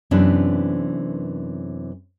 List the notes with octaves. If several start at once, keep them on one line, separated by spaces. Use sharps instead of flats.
F#2 C3 E3 B3 C4 D4